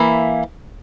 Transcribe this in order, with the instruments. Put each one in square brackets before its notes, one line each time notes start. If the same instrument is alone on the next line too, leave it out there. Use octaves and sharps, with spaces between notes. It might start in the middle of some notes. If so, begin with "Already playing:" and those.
Already playing: [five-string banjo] E3 A#3 E4